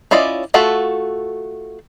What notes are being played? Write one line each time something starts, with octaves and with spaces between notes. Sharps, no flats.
C#4 E4 F4 D5 D#5
A3 F4 F#4 A4 E5